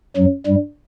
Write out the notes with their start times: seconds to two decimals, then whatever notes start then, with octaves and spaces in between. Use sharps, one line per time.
0.17 F#2 F#3
0.47 G2 G3